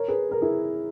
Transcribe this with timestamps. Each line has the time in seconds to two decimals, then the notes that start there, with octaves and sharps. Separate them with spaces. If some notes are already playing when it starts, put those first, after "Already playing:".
Already playing: A#4 C#5
0.08 G#4 B4
0.31 A#4
0.42 E4 G#4